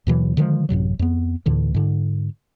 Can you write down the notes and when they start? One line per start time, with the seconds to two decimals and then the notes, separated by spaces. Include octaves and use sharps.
0.07 D#2 B2 E3 F#3
0.37 D3 D#3 F3 G#3
0.69 A1 F#2 C3 F#3
0.99 F2 B3
1.46 D2 A2 D3 E3
1.74 G#2 D3